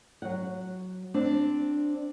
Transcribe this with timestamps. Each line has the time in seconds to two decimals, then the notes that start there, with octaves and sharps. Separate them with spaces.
0.22 F#3 F#5
1.14 C4 D4